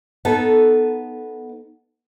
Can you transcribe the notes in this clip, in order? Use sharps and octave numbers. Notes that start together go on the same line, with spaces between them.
B3 D#4 A4